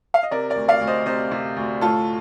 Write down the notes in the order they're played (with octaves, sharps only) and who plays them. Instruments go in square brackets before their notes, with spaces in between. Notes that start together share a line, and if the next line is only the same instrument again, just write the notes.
[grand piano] F5
D#5
C3 A#4 D5
A#4 D5
D2
D5 F5
D2
C5 D#5
C3 C5 D#5
C3
D2
A2 F4 A4